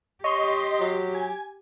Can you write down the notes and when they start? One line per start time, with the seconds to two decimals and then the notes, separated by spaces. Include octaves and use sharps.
0.24 G4 C#5 D#5 C6
0.80 F#3
1.15 G#5